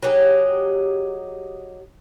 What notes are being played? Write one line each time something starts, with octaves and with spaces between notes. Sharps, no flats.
F#3 D#4 G4 G#4